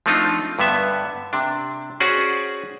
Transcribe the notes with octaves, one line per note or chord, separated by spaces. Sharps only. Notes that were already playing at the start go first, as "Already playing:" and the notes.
F3 A3 C4 D4 D#4 F4
G2 D3 B3 E5
C3 D4
C#4 F#4 G#4 C5 D5